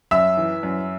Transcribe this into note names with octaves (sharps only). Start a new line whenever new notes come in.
F#2 E5 E6
E3
F#2